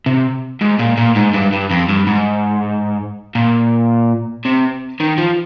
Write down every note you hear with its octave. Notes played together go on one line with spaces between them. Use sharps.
C3
G#2
A#2
A#2
G#2
G2
G2
F2
G2
G#2
A#2
C3
D#3
F3